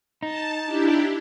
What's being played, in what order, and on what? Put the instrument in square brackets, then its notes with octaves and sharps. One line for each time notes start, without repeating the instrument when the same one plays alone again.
[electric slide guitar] D#4 [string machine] A5
[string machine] D4 E4 G4